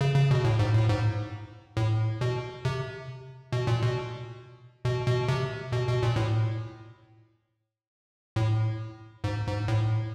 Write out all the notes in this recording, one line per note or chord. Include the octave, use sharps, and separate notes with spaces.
C#3
C#3
B2
A2
G#2
A2
G#2
A2
B2
C3
B2
A#2
B2
B2
B2
C3
B2
B2
A#2
A2
A2
G#2
G#2
A2